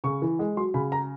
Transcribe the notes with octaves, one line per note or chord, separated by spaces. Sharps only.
C#3 C#6
E3
G#3
F#3 C6
C#3 B5
A#5